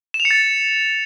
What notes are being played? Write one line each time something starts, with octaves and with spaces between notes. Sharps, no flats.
E7
F7
C#7
A6